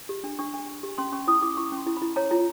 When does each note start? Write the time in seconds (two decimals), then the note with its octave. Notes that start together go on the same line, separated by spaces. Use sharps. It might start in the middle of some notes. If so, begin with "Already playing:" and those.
0.09 G4
0.24 D4
0.39 D4 C#6
0.54 D4
0.68 D4
0.83 G4
0.98 C#4 C6
1.13 C#4 C#6
1.27 E4 D#6
1.42 E4 D6
1.57 E4 C#6
1.72 C#4
1.77 C6
1.86 E4
1.97 E4 B5
2.16 C#5 A#5
2.31 F4 A#5